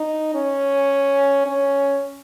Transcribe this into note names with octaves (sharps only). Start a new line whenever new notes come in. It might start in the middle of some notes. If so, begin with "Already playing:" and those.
Already playing: D#4
C#4
C#4